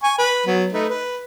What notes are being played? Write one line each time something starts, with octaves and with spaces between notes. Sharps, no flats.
G#5 C#6
B4
F#3 B3
A3 D#4 B4
B4